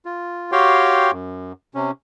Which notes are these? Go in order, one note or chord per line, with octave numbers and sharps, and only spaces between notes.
F4
F#4 G4 C#5 F5 G5 C6
F#2
C3 C#4